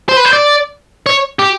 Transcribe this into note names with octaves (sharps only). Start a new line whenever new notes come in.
C5
B4
C5
D5
C#5
G4